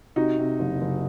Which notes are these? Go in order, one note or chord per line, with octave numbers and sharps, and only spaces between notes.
C3 D#4 F#4
C3
F#1
F#1